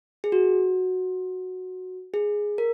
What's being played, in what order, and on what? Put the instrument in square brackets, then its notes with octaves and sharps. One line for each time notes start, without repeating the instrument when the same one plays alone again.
[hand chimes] G#4
F#4
G#4
A#4